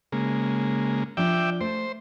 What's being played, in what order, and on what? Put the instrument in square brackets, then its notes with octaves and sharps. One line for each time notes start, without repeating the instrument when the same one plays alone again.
[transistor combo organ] C#3 G#3 A#3
[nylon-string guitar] F3 D4 [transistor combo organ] D5 E5 G5
[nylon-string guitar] A3 [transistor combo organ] C5